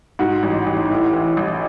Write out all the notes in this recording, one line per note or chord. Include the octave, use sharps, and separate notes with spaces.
G#2 F#4
A1
A1
A2
E3
A1